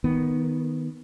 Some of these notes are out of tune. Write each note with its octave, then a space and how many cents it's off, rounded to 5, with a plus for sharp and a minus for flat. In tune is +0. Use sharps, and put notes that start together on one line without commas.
D#3 +10 B3 +0